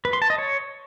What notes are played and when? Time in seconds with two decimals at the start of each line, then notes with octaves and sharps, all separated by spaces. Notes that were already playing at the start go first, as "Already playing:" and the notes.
0.05 B4
0.13 C6
0.22 A5
0.30 D#5
0.38 C#5